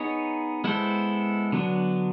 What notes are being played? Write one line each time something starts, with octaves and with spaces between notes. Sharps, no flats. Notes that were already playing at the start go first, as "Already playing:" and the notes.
Already playing: B3 D#4 G#4 C#5
G#3 B3 E4 A4 C5
D3 F#3 B3 D4